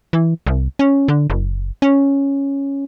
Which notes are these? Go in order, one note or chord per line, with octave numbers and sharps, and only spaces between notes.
E3
C2
C#4
D3
F#1
C#4